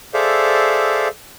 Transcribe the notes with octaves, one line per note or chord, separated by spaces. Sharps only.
G#4 A4 C5 D5 E5 F5